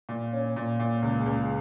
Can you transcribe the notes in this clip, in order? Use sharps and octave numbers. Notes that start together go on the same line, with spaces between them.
A#2
C#4
A#2
A#2
C#2
C#2